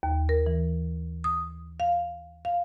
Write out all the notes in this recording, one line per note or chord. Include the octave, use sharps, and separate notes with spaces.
D#2
A#4
E3
D#6
F5
F5